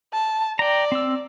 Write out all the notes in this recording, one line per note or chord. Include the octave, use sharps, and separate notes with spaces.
A5
D5 G5 A#5
C4 E6